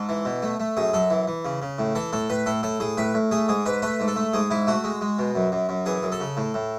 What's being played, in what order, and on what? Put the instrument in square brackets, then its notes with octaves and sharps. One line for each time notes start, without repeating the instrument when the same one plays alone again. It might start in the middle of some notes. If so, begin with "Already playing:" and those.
Already playing: [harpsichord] G#2 A4
E3
B2
A3
A3
F#2 G#4
F#2 A4
E3
E3
C#3
C#3
A2
E3 A4
A2 A4
A2 B4
A2 A4
A2 A4
A2 G#4
A2 B4
A2
A3 G#4
G#2 G#4
G#2 B4
A3 B4
G#2
A4
A3
G#2 G#4
G#2 E4
A3 F#4
G#3
G#3
B2
F#2
F#2
F#2
E3 G#4
F#2
A4
C#3
A2
A2